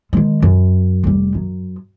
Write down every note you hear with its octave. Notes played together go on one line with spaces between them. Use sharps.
D#3 G#3
F#2
F1 G3
F#2